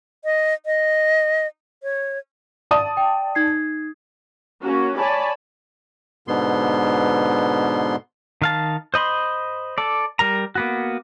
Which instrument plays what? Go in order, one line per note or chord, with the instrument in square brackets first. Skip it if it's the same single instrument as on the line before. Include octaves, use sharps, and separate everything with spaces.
[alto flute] D#5
D#5
C#5
[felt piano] D5 A5 D#6
[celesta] G5
D#4 G#6 C7
[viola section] A#3 C#4 F#4
C#5 D5 G#5 A5 B5
[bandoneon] G#2 B2 D3 B3 C6
[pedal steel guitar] D#3 F5 A5
C5 D#5 B5 C6
A4 D5
G3 A#4 A#5
A#3 B3 F#4